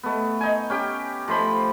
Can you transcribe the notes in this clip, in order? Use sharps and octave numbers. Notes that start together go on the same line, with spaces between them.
A3 B3
D#4 G#5
C#4 G4 G5
F3 A3 C5 B5